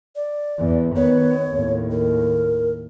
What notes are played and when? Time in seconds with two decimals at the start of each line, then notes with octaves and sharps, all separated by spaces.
0.16 D5
0.59 E2
0.96 D#3 B3 C#5
1.50 D#2 A2
1.91 A#4